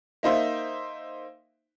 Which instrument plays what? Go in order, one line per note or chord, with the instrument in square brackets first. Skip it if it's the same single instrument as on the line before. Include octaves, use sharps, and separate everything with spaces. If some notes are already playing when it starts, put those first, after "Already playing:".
[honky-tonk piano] A#3 D#4 C5 E5